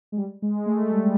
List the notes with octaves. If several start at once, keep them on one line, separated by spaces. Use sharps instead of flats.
G#3
G3
G#3
A3
G3